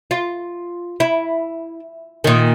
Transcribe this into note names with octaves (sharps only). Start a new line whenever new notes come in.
F4
E4
A#2 D#3